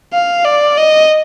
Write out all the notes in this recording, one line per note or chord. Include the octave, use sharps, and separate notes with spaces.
F5
D5
D#5